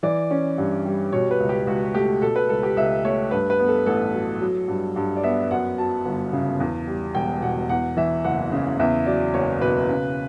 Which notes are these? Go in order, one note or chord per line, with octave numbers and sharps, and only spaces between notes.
E3 D5
C#4
G2
G3
B2 C#5
B4
C#2
G4
C#2 F#4
A3 G4
B2 A4
B4
C#2 A4
G4
C#2 E5
A3 C#5
G2 B4
B4
B3
A4
A1 A4
F#3
F#3
G2
G2
D5
B3 E5
F#2 F#5
F#3 A5
G1
C#3
E2
G3
E1 G5
B2 F#5
E2 F#5
E3 E5
F#1 F#5
C#3
E2 E5
F#3 D5
F#1 C#5
B2 B4
C#3